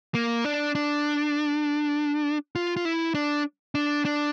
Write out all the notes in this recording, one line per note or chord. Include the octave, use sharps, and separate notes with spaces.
A#3
D4
D4
F4
F4
E4
D4
D4
D4